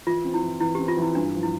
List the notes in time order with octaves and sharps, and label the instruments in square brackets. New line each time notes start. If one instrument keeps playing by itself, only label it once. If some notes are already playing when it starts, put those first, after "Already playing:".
[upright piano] E3 [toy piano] F4
[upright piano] C4
[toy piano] E4
[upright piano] E3
[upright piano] E3 [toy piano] E4
[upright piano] C4 [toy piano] G4
[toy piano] F4
[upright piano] E3
[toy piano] E4
[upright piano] G2 [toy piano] D4
[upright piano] F3
[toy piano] E4